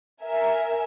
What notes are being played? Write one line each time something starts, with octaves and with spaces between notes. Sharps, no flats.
A#4 E5 G#5